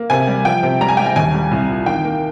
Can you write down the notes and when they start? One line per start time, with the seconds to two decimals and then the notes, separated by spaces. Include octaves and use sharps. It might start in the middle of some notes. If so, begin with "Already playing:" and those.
Already playing: A#3
0.10 C3 G#5
0.27 G3
0.45 F3 G5
0.63 C3
0.81 G3 A#5
0.89 G#5
0.97 G3 G5
1.06 G#5
1.16 D#2 G#5
1.34 G3
1.51 C2
1.69 A#2
1.86 D#3 G5
2.04 A#3